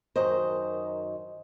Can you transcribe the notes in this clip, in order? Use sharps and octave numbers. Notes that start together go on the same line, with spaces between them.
F#2 D#3 F#3 C5 D#5